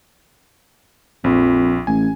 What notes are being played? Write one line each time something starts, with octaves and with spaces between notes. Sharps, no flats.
A#1 F2
A1 G#5